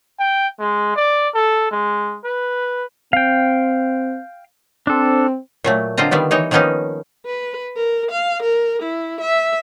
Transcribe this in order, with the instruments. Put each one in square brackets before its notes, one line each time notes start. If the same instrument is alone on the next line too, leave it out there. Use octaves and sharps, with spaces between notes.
[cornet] G5
G#3
D5
A4
G#3
B4
[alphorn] C4 [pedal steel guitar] F5 G5
[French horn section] C4 [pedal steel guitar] D4 A4
[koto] A#2 F#3 A3
D3 C4 F4 D#5 A#5
D3 D#3 G3 B3 D5
E3 D#4 C#5 D#5
D#3 F3 A#3 B3 C#4 D#4
[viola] B4
A#4
F5
A#4
E4
E5